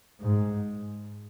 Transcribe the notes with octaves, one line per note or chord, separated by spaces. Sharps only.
G#2